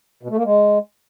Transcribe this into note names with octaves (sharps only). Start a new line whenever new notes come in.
B2
A3
A#3
G#3